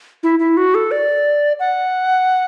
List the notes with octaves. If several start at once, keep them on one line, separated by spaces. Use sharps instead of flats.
E4
E4
F#4
A4
D5
F#5